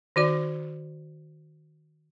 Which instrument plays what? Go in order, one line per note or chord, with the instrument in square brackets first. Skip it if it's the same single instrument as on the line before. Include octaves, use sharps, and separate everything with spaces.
[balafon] D#3 F#4 D5